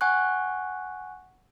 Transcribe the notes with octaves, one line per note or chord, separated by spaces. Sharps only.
F#5 G#5 C#6 F#6